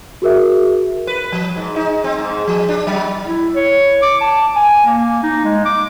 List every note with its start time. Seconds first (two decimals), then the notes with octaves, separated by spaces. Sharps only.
0.22 F#4 G#4 A#4 E5
1.07 B4
1.32 F3
1.56 G#2
1.76 D#4
2.04 C4
2.18 G#2
2.47 F3
2.68 D4
2.87 F#3
3.26 E4
3.56 C#5
4.02 D6
4.21 A5
4.56 G#5
4.86 A#3
5.23 D#4
5.44 G#3
5.66 D6